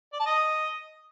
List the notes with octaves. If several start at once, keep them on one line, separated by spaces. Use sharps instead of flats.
D5
A5
D#5